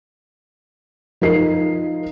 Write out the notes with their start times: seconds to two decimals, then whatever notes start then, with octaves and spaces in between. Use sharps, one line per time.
1.21 F3 D#4 F4 A#4 C7